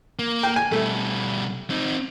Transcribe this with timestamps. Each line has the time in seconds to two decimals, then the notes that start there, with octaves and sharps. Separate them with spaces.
0.19 A#3
0.43 G5
0.56 G#5
0.72 B2 G3 A3
1.70 C4 D#4